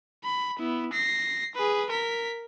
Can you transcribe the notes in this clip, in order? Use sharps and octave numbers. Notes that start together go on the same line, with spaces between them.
B5
B3 E4
A#6 C7
G#4 B4
A#4 B6